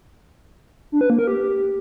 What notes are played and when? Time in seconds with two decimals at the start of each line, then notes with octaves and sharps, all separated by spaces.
0.92 D4
1.01 B4
1.10 A#3
1.19 A#4
1.27 G4